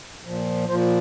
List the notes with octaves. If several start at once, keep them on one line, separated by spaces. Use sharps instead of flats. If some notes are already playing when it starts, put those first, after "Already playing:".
A#2 F3
A#2 F3 C5